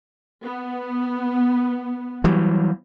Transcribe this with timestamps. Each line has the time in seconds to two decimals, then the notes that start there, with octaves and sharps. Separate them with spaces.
0.44 B3
2.24 E3 F#3 G3